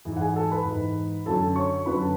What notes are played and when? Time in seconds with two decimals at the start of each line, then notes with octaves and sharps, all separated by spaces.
0.05 G#2 E3
0.17 F#5
0.20 G#4 G#5
0.36 A4 A5
0.51 B4 B5
0.65 G#2 E3
1.26 F#2 D3 A4 A5
1.56 C#5 C#6
1.86 F#2 D3 B4 B5
2.02 A5